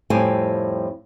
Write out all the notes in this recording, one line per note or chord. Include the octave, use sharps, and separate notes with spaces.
F2 A2 G3 C4 G#5